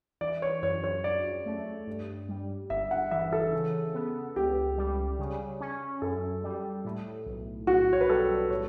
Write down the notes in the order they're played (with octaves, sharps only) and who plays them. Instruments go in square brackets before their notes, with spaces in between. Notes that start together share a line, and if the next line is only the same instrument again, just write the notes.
[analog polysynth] E3 [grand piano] D5
[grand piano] C#5
[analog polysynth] F#2 [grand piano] C#5
[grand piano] C#5
[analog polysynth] F#2 [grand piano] D5
[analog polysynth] A3
G2
G3
[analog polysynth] G1 [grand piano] E5
[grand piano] F#5
[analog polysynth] E3 [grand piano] E5
[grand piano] A4
[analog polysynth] C#3
B3
[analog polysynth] C#2 [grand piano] G4
[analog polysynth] G3
C#3
C#4
[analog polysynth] F#2 [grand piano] A4
[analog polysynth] G3
A2
B1
[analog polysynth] B1 [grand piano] F#4
[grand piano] C#5
B4
[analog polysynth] G3 [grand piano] A4
[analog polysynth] A2 [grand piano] C#5